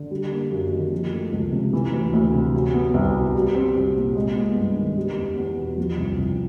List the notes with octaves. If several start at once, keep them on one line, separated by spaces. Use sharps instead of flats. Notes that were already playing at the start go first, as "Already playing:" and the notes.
Already playing: D3
G3
A#3
F#2
D#3
F3
A3
C#2
C3
E3
D2
D2
C3
F#3
B3
C2
B2
G3
C4
C2
A#2
G#3
B3
G2
D#3
G3
E2
E2
B2
F3
C2
C2